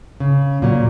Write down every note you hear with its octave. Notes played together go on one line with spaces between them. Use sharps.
C#3
A#2 F#3